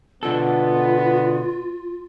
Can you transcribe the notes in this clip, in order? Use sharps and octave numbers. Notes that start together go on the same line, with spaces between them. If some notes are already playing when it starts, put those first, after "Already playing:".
B2 D3 B3 F4 A4